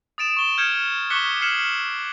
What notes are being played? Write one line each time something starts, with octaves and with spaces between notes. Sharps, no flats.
D#6 A6 D7 E7
C#6 G7
F6 G6 G#6 C#7 E7
C#6 D6 F#6 B6 C#7 G7
F6 G#6 C7 C#7 E7 F#7